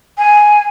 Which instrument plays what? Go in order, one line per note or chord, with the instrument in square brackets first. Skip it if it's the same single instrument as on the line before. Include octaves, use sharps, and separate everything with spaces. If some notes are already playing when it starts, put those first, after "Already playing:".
[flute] G#5